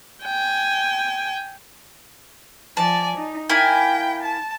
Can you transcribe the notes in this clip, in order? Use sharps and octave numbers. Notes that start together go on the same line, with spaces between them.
G5 G#5
F3 D5 G#5 A5
D#4
A#3 E4 G5 G#5
A5